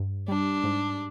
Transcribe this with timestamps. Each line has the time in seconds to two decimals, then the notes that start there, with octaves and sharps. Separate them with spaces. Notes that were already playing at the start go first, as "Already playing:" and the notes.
Already playing: G2
0.28 G3 D4
0.63 G#2